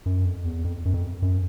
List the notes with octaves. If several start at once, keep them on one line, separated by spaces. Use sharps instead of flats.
F#2
F2
E2
F2
F#2
F2
F#2